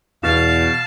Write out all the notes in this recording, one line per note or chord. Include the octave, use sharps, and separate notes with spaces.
E2 B2 F5 A5